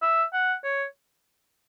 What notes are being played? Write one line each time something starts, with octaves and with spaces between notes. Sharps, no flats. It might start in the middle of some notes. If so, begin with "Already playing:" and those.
E5
F#5
C#5